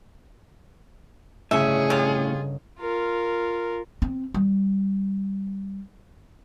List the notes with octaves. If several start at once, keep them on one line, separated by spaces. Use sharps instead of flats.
G1 A2 C#3 C#4 G#4 D#5 E5
C3 F4
F4 A#4
C4
G3